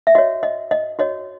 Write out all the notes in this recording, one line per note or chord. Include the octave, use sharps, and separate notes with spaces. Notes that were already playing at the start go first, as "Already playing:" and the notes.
E5
F#4 C#5 D#5
D#5
D#5
F#4 C#5 D#5